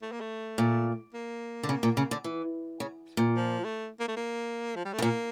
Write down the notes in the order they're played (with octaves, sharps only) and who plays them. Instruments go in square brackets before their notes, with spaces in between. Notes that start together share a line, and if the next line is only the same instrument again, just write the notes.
[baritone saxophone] A3
A#3
A3
[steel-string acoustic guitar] A#2
[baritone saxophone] A#3
[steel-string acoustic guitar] D3
C#3
A#2
C#3
D3
E3
C#3
A#2
[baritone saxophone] F3
A3
A#3
A3
A#3
F3
G3
A3
[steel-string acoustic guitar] C#3
[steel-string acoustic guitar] A#2 [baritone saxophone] A#3